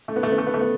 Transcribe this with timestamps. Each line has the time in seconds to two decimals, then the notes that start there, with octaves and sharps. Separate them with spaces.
0.08 A3
0.16 B3
0.23 A3
0.32 B3
0.38 A3
0.47 B3
0.54 A3
0.61 B3